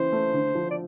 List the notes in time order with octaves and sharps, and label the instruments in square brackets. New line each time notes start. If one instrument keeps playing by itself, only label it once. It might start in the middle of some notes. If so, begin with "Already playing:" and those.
Already playing: [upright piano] C#3 E3 [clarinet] C5
[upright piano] A3
D3
F3
[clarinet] D5